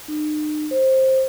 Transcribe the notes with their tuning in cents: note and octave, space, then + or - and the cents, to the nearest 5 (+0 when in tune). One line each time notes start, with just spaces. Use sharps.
D#4 -40
C5 +15